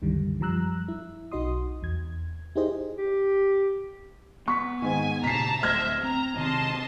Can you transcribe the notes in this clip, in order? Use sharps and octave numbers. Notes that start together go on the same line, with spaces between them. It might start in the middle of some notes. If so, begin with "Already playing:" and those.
C2 F#2 D3 D#3 G3
F#2 F3 G3 A#5 E6 F#6
E4
B1 D#4 F#4 D#5 C6 D#6
E2 G#6
D#4 E4 G4 G#4 C5 D#5
G4
B3 C#6 B6
G#2 D#3 G#5
A#2 C#3 A5 A#5 B6 C7
D1 A3 C5 E5 F6 G#6 A#6
C4 A#5
C3 D#3 C4 D#5 A5 C6